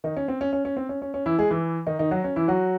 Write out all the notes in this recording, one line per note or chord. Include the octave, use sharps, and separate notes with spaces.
D#3 D#4
C#4
C4
C#4
C#4
C#4
C4
C#4
C#4
C#4
E3 E4
G#3 G#4
E3 E4
D#3 D#4
D#3 D#4
F#3 F#4
C#4
E3 E4
F#3 F#4